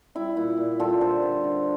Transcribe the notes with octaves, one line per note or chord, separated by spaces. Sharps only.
G3 E4
A#2 E4
A#2
G3 F4 A4
D3 A4 C5
D3
D3